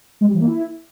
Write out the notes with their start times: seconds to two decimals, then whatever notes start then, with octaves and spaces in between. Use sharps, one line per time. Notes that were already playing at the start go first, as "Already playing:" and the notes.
0.21 G#3
0.27 G3
0.34 E3
0.41 A#3
0.47 E4